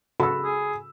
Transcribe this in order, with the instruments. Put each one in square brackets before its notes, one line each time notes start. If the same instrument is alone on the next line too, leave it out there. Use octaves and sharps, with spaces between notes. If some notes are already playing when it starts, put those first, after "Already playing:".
[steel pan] C#3 F#4 A4 [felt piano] B5 E6
[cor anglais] G#4